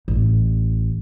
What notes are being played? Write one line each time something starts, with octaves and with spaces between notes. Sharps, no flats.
A1